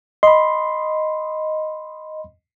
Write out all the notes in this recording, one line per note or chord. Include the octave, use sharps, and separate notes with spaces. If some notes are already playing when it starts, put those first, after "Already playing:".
D#5 B5 C6